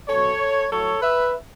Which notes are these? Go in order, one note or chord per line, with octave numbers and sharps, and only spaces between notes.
B2 F#3 A4 C#5
A2 F#3 A4 C#5
B4 E5